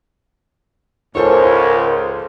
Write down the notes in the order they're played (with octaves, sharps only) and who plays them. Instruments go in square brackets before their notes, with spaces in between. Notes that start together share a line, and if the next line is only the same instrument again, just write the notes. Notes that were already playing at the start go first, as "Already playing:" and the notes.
[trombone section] C#2 G#2 [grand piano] F4 A4 C5 [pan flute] A#4 [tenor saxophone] C#5